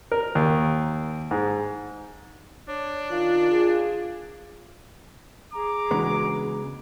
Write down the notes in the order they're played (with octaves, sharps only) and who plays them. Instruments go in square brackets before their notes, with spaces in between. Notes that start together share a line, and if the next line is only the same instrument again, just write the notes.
[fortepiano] A#4
D#2
G#2
[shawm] D4 [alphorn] C#5
[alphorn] D#3 [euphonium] F4
[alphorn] G#4
[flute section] G#4 A#5 [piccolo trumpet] D6
[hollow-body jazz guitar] C#3 G#3 B3 [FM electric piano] E3 D4 F#4